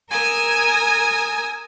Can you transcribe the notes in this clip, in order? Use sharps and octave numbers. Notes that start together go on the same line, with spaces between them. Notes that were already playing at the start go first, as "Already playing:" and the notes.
A#4 G#5 D#6 E6